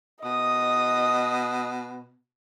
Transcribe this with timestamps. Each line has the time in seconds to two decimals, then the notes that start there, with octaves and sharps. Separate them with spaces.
0.24 B2 D#5 D#6